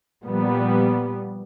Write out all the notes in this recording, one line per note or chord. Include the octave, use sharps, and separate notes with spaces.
A#2 F3 G3 B3